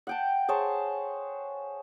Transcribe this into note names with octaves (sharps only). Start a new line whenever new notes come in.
F#5 G5 A5
G#4 C5 C#5 A5